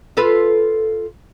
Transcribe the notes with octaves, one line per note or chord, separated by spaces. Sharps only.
F4 A4 B4